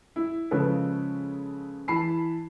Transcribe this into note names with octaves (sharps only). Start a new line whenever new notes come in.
E4
C#3 F3 G#3 C#4 A4 B4
E3 A5 B5 C7